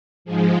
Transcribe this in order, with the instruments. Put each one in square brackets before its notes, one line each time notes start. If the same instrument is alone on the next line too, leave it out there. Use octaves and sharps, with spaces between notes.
[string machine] G#2 F3 G#3